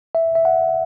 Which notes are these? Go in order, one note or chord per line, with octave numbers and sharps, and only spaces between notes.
E5
E5
F#5